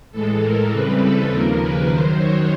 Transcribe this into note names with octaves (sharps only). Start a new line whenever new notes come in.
A2 E3 G#3 A4
A#4
C#3 E3 G3 C4 B4
A4
D#2 C#3 F3 A#3 A#4
B4
F#2 D#3 F#3 C5
C#5